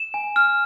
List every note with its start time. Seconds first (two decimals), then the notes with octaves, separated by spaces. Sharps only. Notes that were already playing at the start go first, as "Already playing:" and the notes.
Already playing: E7
0.14 G#5
0.36 F6